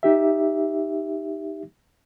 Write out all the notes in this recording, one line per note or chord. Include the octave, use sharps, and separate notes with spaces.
D#4 G4 E5